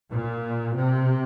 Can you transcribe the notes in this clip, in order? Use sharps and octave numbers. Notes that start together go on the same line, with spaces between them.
A#2
C3